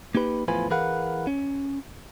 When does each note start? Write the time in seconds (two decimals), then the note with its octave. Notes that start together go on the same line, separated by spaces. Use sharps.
0.15 A#3 D#4 G4 B4
0.48 E2 A2 F3 F4 B4 G#5
0.70 E3 G#4 A#4 B4 F5 F#5
1.27 C#4